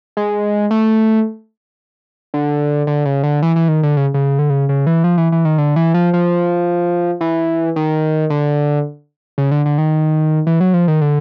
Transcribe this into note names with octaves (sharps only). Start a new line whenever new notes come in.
G#3
A3
D3
D3
C#3
D3
E3
E3
D#3
D3
C#3
C#3
D3
C#3
C#3
E3
F3
E3
E3
D#3
D3
E3
F3
F3
E3
D#3
D3
C#3
D3
D3
D#3
E3
F#3
F3
D#3
D3